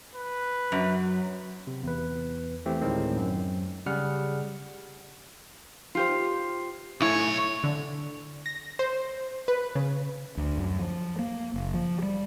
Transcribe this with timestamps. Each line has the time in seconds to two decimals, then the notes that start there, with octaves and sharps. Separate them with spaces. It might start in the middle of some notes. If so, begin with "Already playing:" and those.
0.16 B4
0.72 F#2 F#3
1.67 C3
1.83 E2 B4
2.66 E3 A3 C4 G4
2.81 D2 A2 D#3 G#3 C4
3.17 F#2
3.86 C#3 G3 G#4 F#5 F6
5.95 F4 G4 C5
7.01 B1 A2 E4 C#5 G#5
7.64 D3
8.46 A#6
8.79 C5
9.48 B4
9.75 C#3
10.37 D2
10.58 F#2
10.78 F3
11.19 A#3
11.54 F#1
11.74 F3
12.03 G3